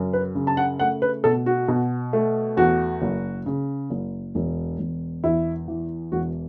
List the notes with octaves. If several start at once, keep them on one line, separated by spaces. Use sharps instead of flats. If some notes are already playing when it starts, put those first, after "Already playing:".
Already playing: F#2 C#3
B4
C#3
A5
F#5
A3 F#5
B4
B2 A4
F#4
B2
A3
E2 F#4
F#1
C#3
F#1
E1
E1
E2 E4
E3
E1 F#4